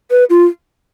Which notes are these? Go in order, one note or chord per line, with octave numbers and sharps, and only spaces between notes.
B4
F4